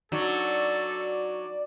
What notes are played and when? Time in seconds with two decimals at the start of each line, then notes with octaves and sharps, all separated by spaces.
0.12 F#3 D4 D#4 F#4 A4 D5